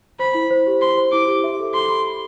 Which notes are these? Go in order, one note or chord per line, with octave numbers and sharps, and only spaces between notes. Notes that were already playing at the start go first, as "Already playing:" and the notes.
C5 B5
E4
C5
G4
C5 C6
C5
E4 D6
G4
E5
A4
A4 C6
B5
B5